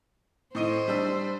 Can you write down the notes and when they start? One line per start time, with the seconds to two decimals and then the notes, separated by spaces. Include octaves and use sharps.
0.55 A2 C5 D#5 D#7
0.88 G3 D4 E6